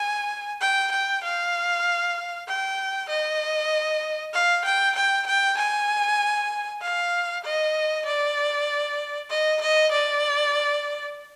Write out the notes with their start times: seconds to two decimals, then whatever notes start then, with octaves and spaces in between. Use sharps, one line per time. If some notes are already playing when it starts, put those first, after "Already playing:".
Already playing: G#5
0.61 G5
0.92 G5
1.23 F5
2.47 G5
3.09 D#5
4.33 F5
4.65 G5
4.96 G5
5.27 G5
5.57 G#5
6.82 F5
7.44 D#5
8.05 D5
9.30 D#5
9.61 D#5
9.91 D5